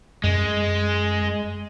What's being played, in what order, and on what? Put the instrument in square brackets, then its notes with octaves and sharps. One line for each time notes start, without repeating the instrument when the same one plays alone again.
[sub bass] F#2 [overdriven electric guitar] G#3